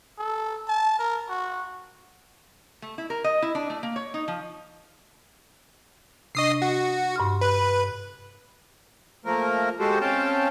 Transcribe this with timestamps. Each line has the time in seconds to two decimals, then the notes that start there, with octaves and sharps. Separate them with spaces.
0.18 A4
0.68 A5
0.99 A#4
1.29 F#4
2.82 A3
2.98 E4
3.10 A#4
3.24 D#5
3.42 E4
3.55 D4
3.70 A3
3.83 A#3
3.96 C#5
4.14 D#4
4.28 F3
6.35 C3 D4 D#5 C#6 D#6 C7
6.62 F#4
7.16 G2 C6 F6
7.41 B4
9.25 F3 A3 A#3 A#4
9.80 G#3 F#4 G4 A4 C5
10.01 C4 C#4 F5 G5 A5